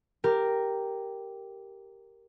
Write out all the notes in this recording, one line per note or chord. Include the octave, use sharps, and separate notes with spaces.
G4 A#4